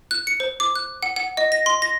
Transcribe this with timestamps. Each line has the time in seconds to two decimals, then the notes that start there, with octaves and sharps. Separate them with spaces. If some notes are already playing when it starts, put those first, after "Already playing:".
0.11 F#6
0.27 C#7
0.40 C5
0.60 D6
0.75 F#6
1.03 F#5
1.16 F#5
1.37 D#5
1.52 A#6
1.66 C6
1.82 A#6